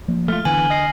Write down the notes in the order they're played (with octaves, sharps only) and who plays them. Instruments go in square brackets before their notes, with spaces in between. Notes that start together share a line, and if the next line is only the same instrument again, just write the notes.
[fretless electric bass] F3 A#3
[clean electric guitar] A3 F4 [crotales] F6
[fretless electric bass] D3 [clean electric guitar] E3 B3 [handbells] G#5 [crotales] F#7
[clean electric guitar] D#5 [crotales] F6 A#6 C7